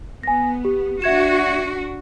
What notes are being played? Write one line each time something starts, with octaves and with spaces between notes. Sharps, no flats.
B3 G#5 A#6
G4
D4 F#4 E5 G#6 E7